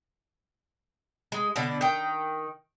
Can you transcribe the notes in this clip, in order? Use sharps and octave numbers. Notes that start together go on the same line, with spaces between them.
G#3
B2 D3 D5
D#3 G5